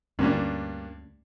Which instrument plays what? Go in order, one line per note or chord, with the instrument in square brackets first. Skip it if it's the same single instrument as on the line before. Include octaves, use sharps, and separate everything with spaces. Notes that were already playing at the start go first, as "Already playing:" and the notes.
[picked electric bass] D2 D3 C#4 [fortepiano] G2 A#3 D4